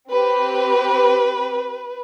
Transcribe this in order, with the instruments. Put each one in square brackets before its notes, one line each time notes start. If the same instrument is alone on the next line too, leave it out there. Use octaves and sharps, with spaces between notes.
[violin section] C4 G4 B4